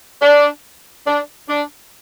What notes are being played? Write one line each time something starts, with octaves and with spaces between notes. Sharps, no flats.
D4
D4
D4